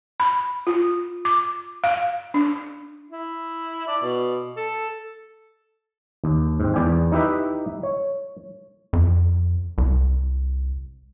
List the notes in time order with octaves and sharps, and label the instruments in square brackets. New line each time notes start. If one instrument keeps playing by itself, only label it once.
[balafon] B5
F4
D6
F5
D4
[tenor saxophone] E4
D5
B2
A4
[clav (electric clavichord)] D#2
G#2 C4
E2 D5 G5 G#5
D#4 E4 G4 B4 E5
C#5
[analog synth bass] F2
C2